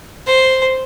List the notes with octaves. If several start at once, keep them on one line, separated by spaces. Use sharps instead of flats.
C5